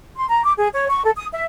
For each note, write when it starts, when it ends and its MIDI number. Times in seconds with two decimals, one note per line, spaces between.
0.17 0.26 84
0.29 0.43 82
0.44 0.53 86
0.58 0.68 68
0.73 0.87 73
0.88 1.02 85
1.04 1.12 69
1.16 1.26 87
1.32 1.45 76